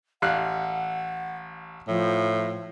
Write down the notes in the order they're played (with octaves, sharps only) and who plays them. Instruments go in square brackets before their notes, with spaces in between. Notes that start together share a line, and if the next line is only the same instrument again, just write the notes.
[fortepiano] A1 F5 F#6 [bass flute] F#5
[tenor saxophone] A2 [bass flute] F3